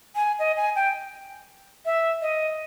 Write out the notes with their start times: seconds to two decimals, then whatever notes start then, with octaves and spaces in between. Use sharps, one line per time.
0.15 G#5
0.39 D#5
0.57 G#5
0.76 G5
1.86 E5
2.22 D#5